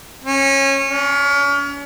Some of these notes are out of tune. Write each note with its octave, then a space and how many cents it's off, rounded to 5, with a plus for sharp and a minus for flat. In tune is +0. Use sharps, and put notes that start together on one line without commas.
C#4 -20
C#4 +35